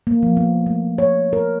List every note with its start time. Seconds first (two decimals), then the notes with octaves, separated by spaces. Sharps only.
0.07 A#3
0.23 F3
0.37 B3
0.67 A3
0.98 C#5
1.33 A#4